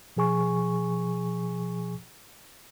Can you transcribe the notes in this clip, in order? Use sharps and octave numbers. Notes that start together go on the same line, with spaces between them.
B2 F3 G#4 G#5 C#6